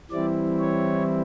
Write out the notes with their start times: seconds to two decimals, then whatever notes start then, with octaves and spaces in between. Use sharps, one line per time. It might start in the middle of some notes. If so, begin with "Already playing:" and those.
0.11 E3 G3 C4 E4 D5
0.60 C#5